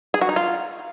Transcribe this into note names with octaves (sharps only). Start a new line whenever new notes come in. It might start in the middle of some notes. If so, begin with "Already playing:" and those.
G#4
F#4
D#4
F4